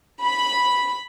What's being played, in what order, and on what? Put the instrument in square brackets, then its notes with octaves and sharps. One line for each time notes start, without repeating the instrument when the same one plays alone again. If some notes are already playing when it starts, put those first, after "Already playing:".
[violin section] B5